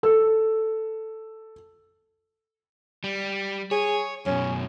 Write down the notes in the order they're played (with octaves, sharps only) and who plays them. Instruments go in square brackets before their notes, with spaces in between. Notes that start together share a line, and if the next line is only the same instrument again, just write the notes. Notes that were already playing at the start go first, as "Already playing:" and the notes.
[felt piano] A4 E6
[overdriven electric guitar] G3
[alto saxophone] G#4 [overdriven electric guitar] C#5
[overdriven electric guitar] F#2 B2 [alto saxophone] C#4